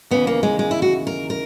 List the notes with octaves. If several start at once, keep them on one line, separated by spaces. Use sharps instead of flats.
D#2 C#3 E3 B3
A#3
G#3
G#3
E4
F#4
A#4
A#4